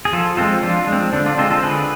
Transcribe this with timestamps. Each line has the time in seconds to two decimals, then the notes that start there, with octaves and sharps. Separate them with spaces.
0.05 G#4
0.13 F3 F4 A4
0.37 G#3 C4 F4 A4
0.63 F3 D4 F4
0.87 G#3 C4
1.13 D3 D4
1.26 D4 F4
1.38 G#3 C4 F4 A4
1.51 F4 A4
1.63 D3 G#4 B4